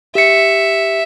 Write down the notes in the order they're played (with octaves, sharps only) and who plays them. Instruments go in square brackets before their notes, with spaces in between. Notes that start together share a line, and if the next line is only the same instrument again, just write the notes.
[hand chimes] G4 C#7 [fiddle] E5